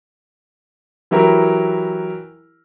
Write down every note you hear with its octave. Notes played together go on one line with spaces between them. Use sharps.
E3 F#3 E4 G4 A#4